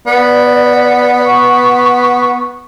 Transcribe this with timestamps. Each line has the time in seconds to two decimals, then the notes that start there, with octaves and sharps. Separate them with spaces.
0.06 B3 D5
1.24 C#6